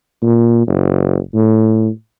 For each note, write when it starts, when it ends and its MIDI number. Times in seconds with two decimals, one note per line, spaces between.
0.22 0.64 46
0.67 1.18 30
1.34 1.89 45